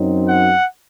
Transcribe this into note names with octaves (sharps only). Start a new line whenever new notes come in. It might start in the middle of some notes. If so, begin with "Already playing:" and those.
Already playing: F#2 F#3 C4 D#4
F#5